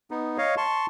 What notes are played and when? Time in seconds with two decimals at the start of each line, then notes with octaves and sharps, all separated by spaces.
0.11 B3 D#4
0.38 C#5 D#5 F5
0.57 A5 C6 C#6